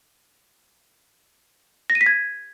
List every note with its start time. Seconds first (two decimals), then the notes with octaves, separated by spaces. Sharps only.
1.90 A#6
1.95 D#7
2.01 B6
2.06 G#6